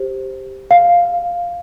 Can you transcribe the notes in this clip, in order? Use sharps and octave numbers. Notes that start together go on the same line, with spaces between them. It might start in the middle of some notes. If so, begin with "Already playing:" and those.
Already playing: G4 C5
F5